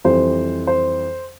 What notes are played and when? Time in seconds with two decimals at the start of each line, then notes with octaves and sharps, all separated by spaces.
0.05 F2 E3 G3 C5
0.67 C5